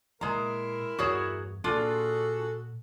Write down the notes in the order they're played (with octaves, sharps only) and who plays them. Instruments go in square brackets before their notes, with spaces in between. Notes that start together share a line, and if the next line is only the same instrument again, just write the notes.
[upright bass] A#2 [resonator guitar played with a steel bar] G#3 A#5 [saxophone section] E4 A#4
[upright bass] E2 G2 [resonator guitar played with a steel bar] F#4 G#4 C#5
[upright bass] A#2 [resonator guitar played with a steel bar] D4 F4 [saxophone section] F#4 G#4 A4